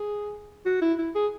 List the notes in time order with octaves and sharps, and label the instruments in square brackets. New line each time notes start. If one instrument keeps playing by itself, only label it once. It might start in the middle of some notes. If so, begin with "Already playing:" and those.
Already playing: [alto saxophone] G#4
F#4
E4
E4
G#4